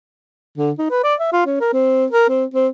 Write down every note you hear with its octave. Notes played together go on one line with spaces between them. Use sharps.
D3
D#4
B4
D5
E5
F4
C#4
A#4
C4
A#4
C4
C4